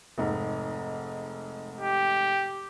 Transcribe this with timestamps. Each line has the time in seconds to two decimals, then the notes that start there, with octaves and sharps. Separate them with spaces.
0.18 F1 G#2
1.81 G4